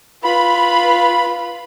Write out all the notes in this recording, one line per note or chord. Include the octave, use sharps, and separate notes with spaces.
F4 B4 B5